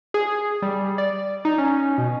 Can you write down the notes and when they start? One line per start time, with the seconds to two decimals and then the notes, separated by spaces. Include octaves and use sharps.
0.14 G#4
0.62 G3
0.98 D5
1.45 D#4
1.58 C#4
1.98 B2